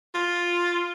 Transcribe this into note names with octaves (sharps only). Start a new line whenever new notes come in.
F4